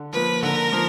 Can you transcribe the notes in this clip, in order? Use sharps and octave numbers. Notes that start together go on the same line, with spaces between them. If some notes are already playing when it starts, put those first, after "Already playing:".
Already playing: D3
F3 A#3 B4
D3 A#4
F3 A#3